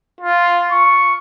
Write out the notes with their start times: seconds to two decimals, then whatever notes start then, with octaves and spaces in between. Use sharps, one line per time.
0.21 F4
0.71 C#6